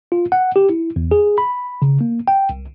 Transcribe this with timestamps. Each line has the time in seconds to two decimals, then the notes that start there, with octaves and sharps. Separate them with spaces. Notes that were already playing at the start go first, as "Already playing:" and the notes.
0.12 F4
0.32 F#5
0.56 G4
0.69 E4
0.96 E2
1.11 G#4
1.38 B5
1.82 C#3
2.01 A#3
2.28 G5
2.49 C2